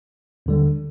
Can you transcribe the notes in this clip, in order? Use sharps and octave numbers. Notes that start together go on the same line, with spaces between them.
D#2 D3 G3